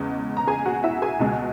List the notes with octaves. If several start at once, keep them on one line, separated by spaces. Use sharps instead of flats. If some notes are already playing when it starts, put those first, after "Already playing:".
Already playing: E2 C#3 G#3
A#5
G#4 G#5
F#4 F#5
E4 E5
G#4 G#5
C#2 B2 G#3